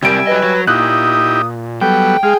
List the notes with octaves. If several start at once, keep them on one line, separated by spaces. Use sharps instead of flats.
C3 G3 C4 A#4 E5 G#5 D7
F#3 B4 D#5
F#3
A#2 D#4 E4 G4 D#6 F#6
F#3 G3 B3 A4 G5
G#3 G#4 F5